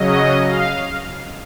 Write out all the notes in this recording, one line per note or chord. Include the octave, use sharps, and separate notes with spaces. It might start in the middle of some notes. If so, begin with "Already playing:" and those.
Already playing: C#3 F#3 C#4 D#5
F5